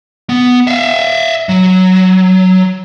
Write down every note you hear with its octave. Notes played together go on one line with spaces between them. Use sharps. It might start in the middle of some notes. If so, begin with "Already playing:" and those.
B3
E5 F5
F#3